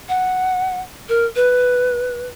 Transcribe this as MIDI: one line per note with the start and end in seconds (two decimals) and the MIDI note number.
0.09 0.81 78
1.09 1.25 70
1.36 2.27 71